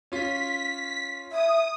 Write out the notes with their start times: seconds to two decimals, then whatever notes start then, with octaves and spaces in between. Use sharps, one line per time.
0.12 C#4 F4 B6
1.32 E5 D#6